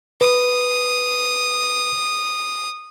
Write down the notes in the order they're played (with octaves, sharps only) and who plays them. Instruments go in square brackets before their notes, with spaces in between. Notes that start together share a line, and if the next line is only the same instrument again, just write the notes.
[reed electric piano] B4 [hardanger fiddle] D#6